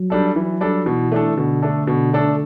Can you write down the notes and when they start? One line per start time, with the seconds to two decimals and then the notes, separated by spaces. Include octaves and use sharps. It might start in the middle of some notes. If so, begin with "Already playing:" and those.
Already playing: F#3
0.10 G3 D4 A4
0.35 E3 F#3
0.60 G3 D4 A4
0.86 B2 E3
1.12 A3 D4 A4
1.36 B2 D3
1.62 A3 D4 A4
1.87 B2
2.13 A3 D4 A4